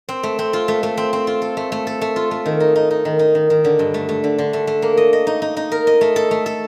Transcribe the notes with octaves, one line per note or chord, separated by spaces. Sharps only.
C4
A3
C4
F4
A3
A3
C4
C4
F4
A4
A3
A3
A4
A3
F4
A3
D#3
D#4
D#4
D#4
D#3
D#4
D#3
D#3
D3
G2
A3
A3
D3
D3
A3
A3
A#3
D#5
D#5
D#4
D#4
D#4
A#4
D#5
A3
A4
A3
A4